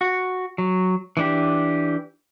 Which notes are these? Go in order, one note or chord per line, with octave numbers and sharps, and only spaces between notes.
F#4
F#3
E3 D4 G4